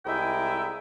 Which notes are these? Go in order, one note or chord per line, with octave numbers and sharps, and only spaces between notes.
C2 G#3 D#4 E4 E5 G5